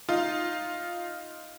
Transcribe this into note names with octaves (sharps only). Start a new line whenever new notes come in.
D#4 F4